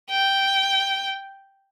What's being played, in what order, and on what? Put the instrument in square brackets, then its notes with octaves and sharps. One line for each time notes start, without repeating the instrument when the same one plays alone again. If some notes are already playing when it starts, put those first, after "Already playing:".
[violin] G5